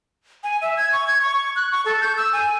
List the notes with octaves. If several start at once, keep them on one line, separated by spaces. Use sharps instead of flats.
G#5
E5
G#6
C#6
G#6
C#6
F#6
C#6
A4
G6
E6
G#5